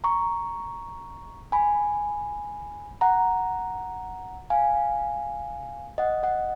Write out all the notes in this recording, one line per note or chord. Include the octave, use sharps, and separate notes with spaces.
A#5 C#6
G#5 B5
F#5 A#5
F5 G#5
D#5 F#5
D#5 F#5